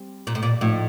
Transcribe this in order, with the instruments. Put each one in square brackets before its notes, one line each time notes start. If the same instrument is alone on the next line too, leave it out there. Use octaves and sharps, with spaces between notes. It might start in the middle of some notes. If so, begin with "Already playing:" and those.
Already playing: [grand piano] G3 C4 G4
[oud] A#2
A2
A#2
[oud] A2 [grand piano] F3 A3 D#4